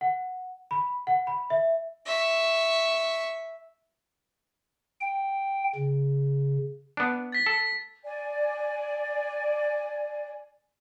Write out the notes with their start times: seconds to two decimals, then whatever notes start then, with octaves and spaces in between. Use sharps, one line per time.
0.01 F#5
0.71 B5
1.07 F#5
1.27 B5
1.50 E5
2.06 E5 C#6
5.01 G5
5.75 C#3
6.97 B3 D4
7.32 A6 B6
7.46 A4
8.03 D5 G#5